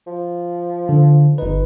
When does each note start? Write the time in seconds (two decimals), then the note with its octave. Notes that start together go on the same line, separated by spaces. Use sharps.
0.07 F3
0.89 D3
1.38 G1 D#4 B4